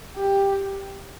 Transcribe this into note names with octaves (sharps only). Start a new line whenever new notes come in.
G4